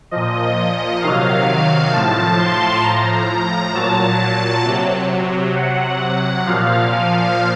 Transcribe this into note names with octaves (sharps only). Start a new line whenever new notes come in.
A#2 F3 D#5
C3 D#3 F#3 F5
A2 F3 A5
C6
A2 F3 A#5
A#2 F#3 A5
A5
C3 F#3
C3 F#3 F#5
A#2 F3 F5